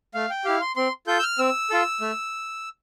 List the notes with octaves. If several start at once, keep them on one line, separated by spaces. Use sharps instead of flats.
A3 F5
G5
E4 G4 F5
C6
C4 C6
F4 A4 G6
E6
F6
C4 E6
F4 A4
A3